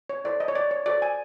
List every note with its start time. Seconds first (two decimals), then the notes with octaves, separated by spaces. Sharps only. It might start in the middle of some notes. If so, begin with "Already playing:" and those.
0.10 C#5
0.24 E4 A4 C5 D5
0.40 D#5
0.48 C#5
0.55 D5
0.71 C#5
0.86 F#4 A4 C5 D5
1.02 G#5